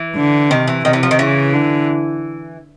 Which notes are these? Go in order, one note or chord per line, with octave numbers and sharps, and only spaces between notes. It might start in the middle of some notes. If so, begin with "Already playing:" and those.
Already playing: E3
D3
C3 D#3
E3
C3 D#3
E3
F3
D#3
C#3 E3
D3